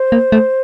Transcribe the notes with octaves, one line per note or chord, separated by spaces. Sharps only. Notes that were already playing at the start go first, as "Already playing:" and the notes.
Already playing: C5
A#3
A3